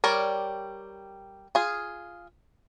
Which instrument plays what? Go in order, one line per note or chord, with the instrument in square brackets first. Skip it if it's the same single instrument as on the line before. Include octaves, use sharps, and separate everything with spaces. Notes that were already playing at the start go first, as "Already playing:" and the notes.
[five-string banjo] G3 A#4 C#5 D5
F4 G#4